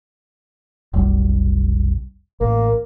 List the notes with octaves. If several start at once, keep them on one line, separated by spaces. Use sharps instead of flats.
F1 B1 G3
A1 A#3